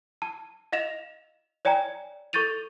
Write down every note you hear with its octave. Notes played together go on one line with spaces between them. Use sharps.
A5
D#5 F5 A#6 E7 F7
C#5 D5 G5 G#5 A#5
A4 C#6 G6 A6 D#7 F7